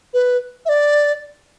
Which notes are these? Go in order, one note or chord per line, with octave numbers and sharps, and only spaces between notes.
B4
E5
D5